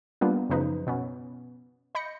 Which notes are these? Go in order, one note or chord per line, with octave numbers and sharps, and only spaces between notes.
G3 A#3 B3 D4 F4
F#2 C#3 F3 D#4 B4
B2 B3 C#4
D#5 B5 G6 A#6 C#7